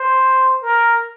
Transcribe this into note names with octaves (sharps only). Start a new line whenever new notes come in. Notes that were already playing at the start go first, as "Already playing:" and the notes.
Already playing: C5
A#4